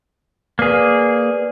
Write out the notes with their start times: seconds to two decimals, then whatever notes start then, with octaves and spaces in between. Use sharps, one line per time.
0.59 A#3 G#4 B4 D5